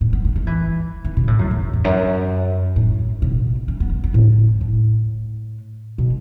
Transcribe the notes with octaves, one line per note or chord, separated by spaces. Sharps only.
A2
B3
A3
A3
E3
E3
B2
A2
F#2
E2
E2
F#2
A2
B2
C#4
B3
B3
A2
A2
B2